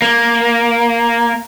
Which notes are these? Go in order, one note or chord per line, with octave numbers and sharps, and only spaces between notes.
A#3